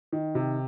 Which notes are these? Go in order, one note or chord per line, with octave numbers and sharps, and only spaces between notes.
D#3
C3